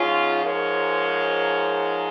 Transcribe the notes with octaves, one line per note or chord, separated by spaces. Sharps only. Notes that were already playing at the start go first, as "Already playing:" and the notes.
Already playing: G#2 F3 G#3 C#4 F4
A#4 C#5